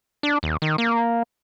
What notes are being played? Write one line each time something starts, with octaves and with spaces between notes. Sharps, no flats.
D4
D#2
D#3
A#3